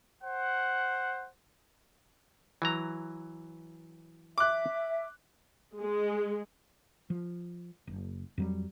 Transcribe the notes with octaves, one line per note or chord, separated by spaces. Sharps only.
C5 F#5
E3 F#3 A#5
E5 D6 F#6
G#3
F3
F#1
F2 F#3 G3